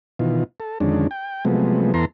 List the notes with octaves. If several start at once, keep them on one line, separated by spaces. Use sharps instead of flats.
B2 D#3 E3 F4
A4
F2 D3 D#3 G#3 C#4 D4
G5
C3 F3 F#3 G#3 A3 B3
E2 E3 B3 A4 A#5 C6